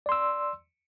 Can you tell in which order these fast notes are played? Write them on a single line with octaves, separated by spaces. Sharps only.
D5 C6 E6